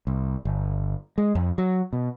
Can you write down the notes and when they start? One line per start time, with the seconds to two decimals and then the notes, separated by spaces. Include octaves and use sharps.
0.07 C2
0.45 G1
1.18 G#3
1.35 F2
1.58 F#3
1.93 B2